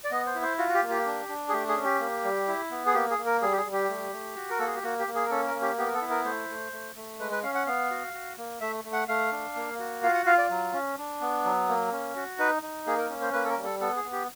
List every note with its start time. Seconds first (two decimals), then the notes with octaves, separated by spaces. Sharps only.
0.04 D5
0.11 B3 D#5
0.26 C5
0.35 E4
0.42 C5
0.58 F4 F#4
0.69 F#4
0.74 G4
0.82 A#3
0.90 G4
1.06 D4
1.29 D4
1.49 G#4
1.52 A3 G4
1.68 G#4
1.76 C#4
1.84 G4
2.00 A#3
2.24 G3
2.48 E4
2.71 B3
2.86 G#4
2.94 A#3 G4
3.11 G#4
3.18 A#3
3.26 A#4
3.42 G3 G#4
3.52 G4
3.57 G#4
3.65 G3
3.73 G4
3.89 A3
4.12 A3
4.36 F#4
4.50 A#4
4.59 A#3 A4
4.67 G#4
4.75 G4
4.83 A#3 F#4
4.99 G4
5.07 A#3
5.15 G#4
5.26 A#4
5.30 C#4 A4
5.46 A#4
5.54 A#3
5.62 G4
5.78 B3 G4
5.86 A#4
5.94 A4
6.02 E4
6.10 A#4
6.25 A3 C5
6.49 A3
6.73 A3
6.96 A3
7.20 G#3 B4
7.31 B4
7.43 C#4 F5
7.55 F#5
7.66 B3 F5
7.91 F#4
8.14 F#4
8.37 A#3
8.61 A3 E5
8.84 A3
8.93 F#5
9.08 A3 F5
9.32 D4
9.55 A#3
9.79 F#4
10.03 F4 F5
10.14 F#5
10.26 F4 F5
10.38 D5
10.50 F#3
10.73 C#4
10.98 D4
11.21 B3
11.45 F#3
11.68 A#3
11.92 C#4
12.16 F#4
12.39 D#4 B4
12.63 D#4
12.86 A#3 G#4
12.97 A#4
13.10 C#4
13.22 C5
13.33 A#3 B4
13.45 A4
13.49 A#4
13.57 G3
13.65 A4
13.81 B3 A4
13.96 G#4
14.04 B3
14.12 G4